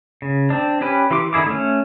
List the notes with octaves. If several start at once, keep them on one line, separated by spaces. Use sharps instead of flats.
C#3
C4 D4
C#4 G4 B4
E3 G4 C6 D6
D3 D#3 E4 G#4 D6
A3 C#4